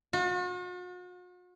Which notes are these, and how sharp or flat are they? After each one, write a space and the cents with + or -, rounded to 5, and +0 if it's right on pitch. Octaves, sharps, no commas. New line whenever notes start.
F#4 -45